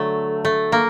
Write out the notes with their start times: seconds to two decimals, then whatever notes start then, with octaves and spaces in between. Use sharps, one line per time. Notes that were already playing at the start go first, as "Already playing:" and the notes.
Already playing: D3 F#3 A3
0.45 A3
0.72 A#3